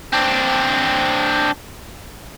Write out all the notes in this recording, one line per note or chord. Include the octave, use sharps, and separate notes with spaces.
C4 D4